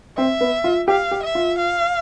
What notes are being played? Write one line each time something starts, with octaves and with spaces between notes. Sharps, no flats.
C4 E5
B3
F4
G4 F5
G4
E5
F4
F5